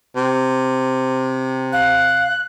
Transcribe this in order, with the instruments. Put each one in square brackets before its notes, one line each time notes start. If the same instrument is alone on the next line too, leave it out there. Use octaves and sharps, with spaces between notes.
[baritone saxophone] C3
[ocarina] F5 [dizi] F#6